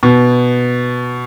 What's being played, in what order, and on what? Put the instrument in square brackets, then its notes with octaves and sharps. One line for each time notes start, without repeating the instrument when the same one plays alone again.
[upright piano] B2